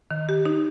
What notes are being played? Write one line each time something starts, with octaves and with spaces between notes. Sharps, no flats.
D#3
G4
D#4